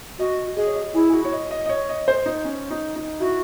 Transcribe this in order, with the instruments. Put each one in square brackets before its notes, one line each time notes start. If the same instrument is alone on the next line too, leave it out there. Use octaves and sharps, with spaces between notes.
[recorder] F#4 [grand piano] D#5
[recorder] G#4 [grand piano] D#5
[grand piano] C#5
D#5
[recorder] E4 [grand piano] G#4
[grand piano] G#4
F#4
C#5
D#5
D#5
D#5
C#5
D#5
C5
D#4
C#4
D#4
D#4
[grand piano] E4 [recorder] F#4